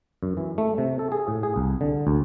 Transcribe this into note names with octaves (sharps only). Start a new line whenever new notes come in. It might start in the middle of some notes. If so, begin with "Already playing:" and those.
F#2
E3
A3
C3
A4
G#4
A2
G#4
C2
D3
D2